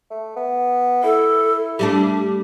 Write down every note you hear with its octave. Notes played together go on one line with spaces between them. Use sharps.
A3
B3
E4 A4
G3 A3 D4 G4